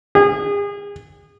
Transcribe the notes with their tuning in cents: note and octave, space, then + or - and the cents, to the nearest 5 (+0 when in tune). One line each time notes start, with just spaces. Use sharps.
G#4 -30